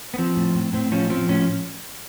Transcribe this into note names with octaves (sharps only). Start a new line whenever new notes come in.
B3
F3 C4
A2
A2
A2 C4
F3 C#4
F3 C4
A2 C#4